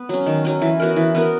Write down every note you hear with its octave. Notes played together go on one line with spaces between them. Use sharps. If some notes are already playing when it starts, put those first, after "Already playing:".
Already playing: B3
F#3 C#4
D#3
F#3 C#4
E3
B3 F#4 A#4
E3
B3 F#4 A#4